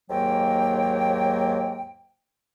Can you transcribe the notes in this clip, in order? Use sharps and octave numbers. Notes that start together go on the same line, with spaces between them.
D#2 G#2 F#3 A#3 G5